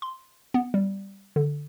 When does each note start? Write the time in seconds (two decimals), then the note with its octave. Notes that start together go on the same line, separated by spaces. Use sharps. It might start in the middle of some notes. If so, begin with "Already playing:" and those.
0.02 C6
0.54 B3
0.74 G3
1.36 D3